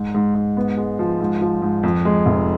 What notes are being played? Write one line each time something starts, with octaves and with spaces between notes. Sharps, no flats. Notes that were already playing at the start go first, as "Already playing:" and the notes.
Already playing: G#2
G#2
G#2
B3
G#3
F3
G#2
F3
G#2
F2
G#3
F1